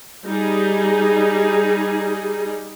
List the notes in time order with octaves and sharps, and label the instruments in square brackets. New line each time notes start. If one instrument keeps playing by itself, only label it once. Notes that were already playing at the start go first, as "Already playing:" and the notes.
[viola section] G3 D#4 G#4